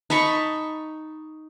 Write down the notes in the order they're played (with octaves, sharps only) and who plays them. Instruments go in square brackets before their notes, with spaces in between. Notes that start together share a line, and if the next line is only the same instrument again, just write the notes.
[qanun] D#4 A5 B5 C#6